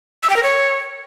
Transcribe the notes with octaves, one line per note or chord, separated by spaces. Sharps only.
E6
G5
A#4
C#5